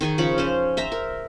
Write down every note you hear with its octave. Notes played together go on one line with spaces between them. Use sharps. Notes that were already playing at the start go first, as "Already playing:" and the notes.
D#3 D#4 G#4 C#6
C#3 F3 C#5 B5
C#4 C5
C5 E5 A#5
A#4